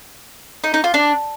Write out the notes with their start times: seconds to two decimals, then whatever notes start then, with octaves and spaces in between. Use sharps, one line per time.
0.64 D#4
0.74 D#4
0.84 F4
0.94 D4